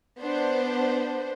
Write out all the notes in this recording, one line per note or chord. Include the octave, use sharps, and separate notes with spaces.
B3 D4 C5